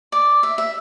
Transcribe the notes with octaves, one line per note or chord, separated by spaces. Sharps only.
D5
E5
E5